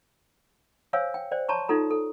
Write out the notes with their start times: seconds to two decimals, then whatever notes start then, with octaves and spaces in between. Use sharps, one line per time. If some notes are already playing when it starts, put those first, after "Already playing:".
0.93 C5 C#5 F5 G#5 E6
1.14 G5
1.32 C5 D5 G5
1.49 C#5 A5 A#5 C6 C#6
1.69 D#4 F4 A4 A#5
1.91 A4